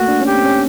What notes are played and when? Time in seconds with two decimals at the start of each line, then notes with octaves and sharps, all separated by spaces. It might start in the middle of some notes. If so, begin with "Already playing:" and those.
Already playing: A3 A#3 F#4
0.08 D4
0.21 C#4 G4
0.34 C4
0.46 C#4